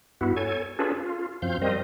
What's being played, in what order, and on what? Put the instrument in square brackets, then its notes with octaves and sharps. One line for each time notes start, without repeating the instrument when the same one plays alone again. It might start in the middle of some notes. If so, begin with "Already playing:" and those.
[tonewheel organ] G2 B3 E4 F#4
A4 C#5 G#5
C#4 D4 F4 G#4 A4 B4
F4
F#2 F3 C4 F5 G6
G3 C4 A#4 C5 D#5